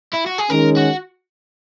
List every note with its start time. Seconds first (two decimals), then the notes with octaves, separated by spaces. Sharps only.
0.13 E4
0.26 F#4
0.38 G#4
0.50 D#3 G#3 C#4 A#4
0.77 F#4